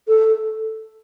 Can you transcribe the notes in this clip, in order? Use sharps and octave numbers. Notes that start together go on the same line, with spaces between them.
A4